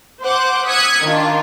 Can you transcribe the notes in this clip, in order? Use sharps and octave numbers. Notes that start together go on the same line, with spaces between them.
C5 F#5 D6
D#6 E6 F#6 G#6 B6 C#7
D#3 D4 F4